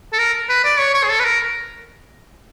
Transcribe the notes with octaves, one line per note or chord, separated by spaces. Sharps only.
A4
A#4
B4
D5
C#5
C#5
G#4
A4
B4
A#4